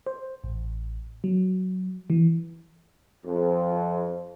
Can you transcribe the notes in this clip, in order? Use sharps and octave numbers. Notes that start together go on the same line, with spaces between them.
C5
A1
F#3
E3
F2